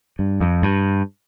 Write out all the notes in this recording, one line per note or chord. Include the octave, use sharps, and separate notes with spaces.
G2
F2
G2